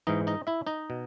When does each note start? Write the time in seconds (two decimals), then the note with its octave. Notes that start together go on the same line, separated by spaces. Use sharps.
0.07 G#2 E3 D#4 D#5
0.27 D#4 D#5
0.47 E4 E5
0.67 D#4 D#5
0.90 B2